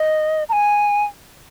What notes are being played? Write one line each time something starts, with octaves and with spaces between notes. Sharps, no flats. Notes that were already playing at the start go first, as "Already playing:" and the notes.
Already playing: D#5
A#5
G#5